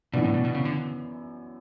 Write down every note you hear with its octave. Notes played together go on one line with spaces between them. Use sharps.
F#2 B2 E3 B3 D4
A2
B2
B2
C#3
D3